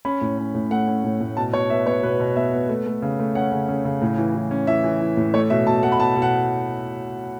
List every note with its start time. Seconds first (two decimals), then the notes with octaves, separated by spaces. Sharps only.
0.05 C#4 B5
0.21 A2
0.38 C#4
0.55 A2
0.71 A3 F#5
0.87 C#4
1.04 A2
1.20 A2
1.37 B2 A5
1.53 B2 C#5
1.70 B3 E5
1.86 B3 C#5
2.03 B2 B4
2.20 B2
2.36 B3 E5
2.53 B3
2.69 A3
2.86 A3
3.02 C#3
3.19 A3
3.35 C#4 F#5
3.52 C#3
3.69 C#3
3.85 C#3
4.02 A2
4.18 E3
4.35 E3
4.51 C#4
4.67 E3 E5
4.84 E3
5.01 E3
5.17 A2
5.34 A3 C#5
5.50 B2 E5
5.67 B2 A5
5.83 A3 F#5
5.92 B5
5.99 B2 A5
6.16 B2
6.22 F#5